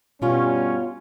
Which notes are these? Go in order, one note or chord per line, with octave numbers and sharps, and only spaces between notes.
G2 B2 G3 C#4 F4